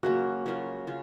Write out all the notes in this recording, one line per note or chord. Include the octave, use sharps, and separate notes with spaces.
C#3 F#3 A#3 F4 F#4
C#3 F#3 A#3 F4
C#3 F4